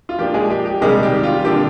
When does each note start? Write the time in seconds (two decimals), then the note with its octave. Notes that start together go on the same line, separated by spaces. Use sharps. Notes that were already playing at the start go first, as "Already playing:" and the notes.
0.09 F4
0.19 F3 A#3 D4 G4
0.34 G#3 G#4
0.50 G4
0.65 G4
0.81 C3 D#3 G3 G#3 D4 G#4
1.03 G4
1.23 F4
1.45 D3 F3 A#3 D4 G4